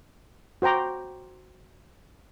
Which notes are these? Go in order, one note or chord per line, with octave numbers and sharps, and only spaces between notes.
F#4 C5 G5 A#5 D6